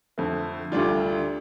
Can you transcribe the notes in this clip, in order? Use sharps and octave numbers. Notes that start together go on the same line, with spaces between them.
F2 D3 A3
D2 D3 G3 D4 F4